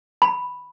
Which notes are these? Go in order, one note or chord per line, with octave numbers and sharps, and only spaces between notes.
B5